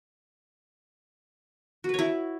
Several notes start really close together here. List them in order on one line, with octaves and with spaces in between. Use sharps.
F#4 B4 C#5 E4